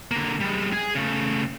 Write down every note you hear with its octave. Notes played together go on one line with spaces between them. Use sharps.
D3 A#3
G3 G#3
G#4 G#5
C#3 A3